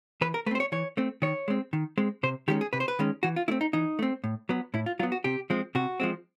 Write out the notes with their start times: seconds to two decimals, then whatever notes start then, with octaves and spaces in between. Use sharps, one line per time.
0.21 E3 B4
0.34 A#4
0.46 A3 B4
0.51 C4 C5
0.60 C#5
0.72 E3 C#5
0.97 A3 C4
1.22 D#3 C#5
1.48 G#3 C4
1.73 D#3
1.98 G#3 C4
2.23 C3 C5
2.48 D#3 G#3 C#4 G4
2.61 G#4
2.73 C3 B4
2.80 C5
2.88 B4
2.99 D#3 G#3 C#4
3.23 E3 F#4
3.36 F4
3.48 A3 C4 E4
3.61 D#4
3.73 E3 D#4
3.99 A3 C4
4.24 A2
4.49 F#3 B3
4.74 A2 E4
4.86 F4
4.99 F#3 F4
5.03 B3
5.12 F#4
5.24 C3 G4
5.50 F3 G#3 C4
5.75 C3 F#4
6.00 F3 G#3 C4